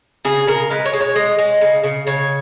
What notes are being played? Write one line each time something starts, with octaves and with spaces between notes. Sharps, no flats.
C#3 G#4
C#3 A#4
G#3 B4
C#5
G#3
C#5
G#3 D#5
G#3
C#3
C#3
C#3 C#5